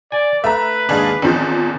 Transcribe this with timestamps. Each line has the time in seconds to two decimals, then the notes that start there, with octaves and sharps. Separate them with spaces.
0.12 D5 G#5
0.44 A3 B4 E5 A#5
0.89 D#2 G#2 D4 G#4 F5
1.22 A1 E2 D#3 F3 C4